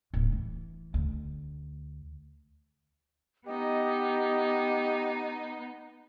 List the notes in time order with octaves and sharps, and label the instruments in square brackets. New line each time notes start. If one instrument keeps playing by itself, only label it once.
[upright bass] D1
E3
D2
[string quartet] B3 D#4 [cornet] G4 [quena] D#5